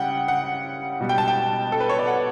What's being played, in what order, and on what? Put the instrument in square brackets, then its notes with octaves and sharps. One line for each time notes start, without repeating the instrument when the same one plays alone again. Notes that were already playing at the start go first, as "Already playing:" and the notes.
Already playing: [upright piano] C#3 G3 F#5 G5
F#5
B2 G3
G5
A5
G5
A4
B4
C#5
D5
F#5